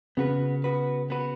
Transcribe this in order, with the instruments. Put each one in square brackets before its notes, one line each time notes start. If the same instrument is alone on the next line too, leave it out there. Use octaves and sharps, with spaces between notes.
[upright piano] C#3 [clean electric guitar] B3 F#4 B4
[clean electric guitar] B3 F#4 B4
B3 F#4 B4